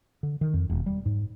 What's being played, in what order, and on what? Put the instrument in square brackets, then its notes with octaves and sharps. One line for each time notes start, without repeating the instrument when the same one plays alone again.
[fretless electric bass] D3
D#3
F2
E1
G3
G#2